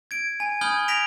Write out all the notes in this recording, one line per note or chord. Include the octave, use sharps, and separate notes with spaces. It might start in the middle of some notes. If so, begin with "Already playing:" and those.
G#6 D7
G#5
B5 D#6 F6 G6 G#6 G7
A#6 B6 D7 F7